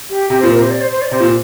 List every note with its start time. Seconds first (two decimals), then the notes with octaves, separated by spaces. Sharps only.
0.10 G4
0.30 C3 G4
0.40 A#2 C5
0.51 A#4
0.57 C3 C5
0.71 D5
0.81 C5
0.91 C5
1.02 D5
1.11 C3 C5
1.20 A#2